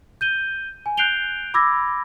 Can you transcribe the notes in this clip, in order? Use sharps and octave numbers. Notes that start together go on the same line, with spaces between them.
G6 D#7 G7
G#5
F#6 G6 C7 D7 F7 G7
B5 D6 E6 G#6 A#6